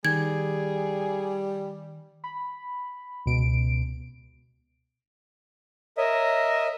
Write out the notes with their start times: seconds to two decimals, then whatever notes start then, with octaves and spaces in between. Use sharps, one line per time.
0.05 D#3 G3 G#4 G#6
2.24 B5
3.26 C#2 B2 D7
5.97 A#4 C#5 D#5 E5